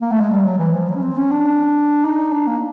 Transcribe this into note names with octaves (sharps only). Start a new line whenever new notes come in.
A#3
A3
G#3
G3
F#3
E3
F3
F#3
C#4
C4
C#4
D4
D#4
D4
A#3